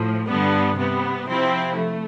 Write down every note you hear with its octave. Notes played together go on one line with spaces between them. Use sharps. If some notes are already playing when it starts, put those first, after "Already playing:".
Already playing: A2 F3
G2 D3 G3 B3
C3 G3 B3
C3 F3 C4 E4
A3